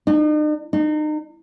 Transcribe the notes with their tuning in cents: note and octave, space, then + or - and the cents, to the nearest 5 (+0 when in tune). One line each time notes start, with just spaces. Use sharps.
D#4 -45
D#4 -35